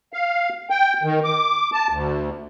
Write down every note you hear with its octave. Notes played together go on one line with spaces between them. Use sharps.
F5
G5
D#3
D6
A5
D2